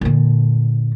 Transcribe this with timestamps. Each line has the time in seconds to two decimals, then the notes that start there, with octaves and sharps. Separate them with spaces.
0.01 A#2 D3